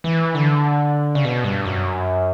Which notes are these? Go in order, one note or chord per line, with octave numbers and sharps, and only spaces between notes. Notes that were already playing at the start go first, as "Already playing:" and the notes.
E3
D3
C#3
B2
G2
F#2